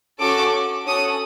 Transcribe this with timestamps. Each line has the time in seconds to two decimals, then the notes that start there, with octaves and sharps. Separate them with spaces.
0.20 C#4 F#4 A4 D6
0.86 C#4 F#4 A4 D#6